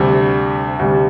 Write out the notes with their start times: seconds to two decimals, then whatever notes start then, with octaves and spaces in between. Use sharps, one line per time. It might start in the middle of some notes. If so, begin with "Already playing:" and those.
Already playing: D2 C3 G3
0.79 D2 C3 G3